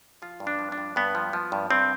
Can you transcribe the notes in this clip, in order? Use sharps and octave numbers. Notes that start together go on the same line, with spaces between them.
F3 F4
G2
D4
F3
D4
G2
G2 B3
F3
F3
G2
G2 C4